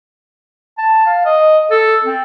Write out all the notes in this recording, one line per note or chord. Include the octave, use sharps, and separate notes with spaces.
A5
F5
D#5
A4
C4